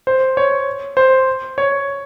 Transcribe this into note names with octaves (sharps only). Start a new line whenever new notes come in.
C5
C#5
C5
C#5